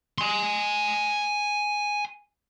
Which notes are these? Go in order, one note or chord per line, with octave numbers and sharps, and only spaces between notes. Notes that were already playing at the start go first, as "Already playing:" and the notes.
G#5 C6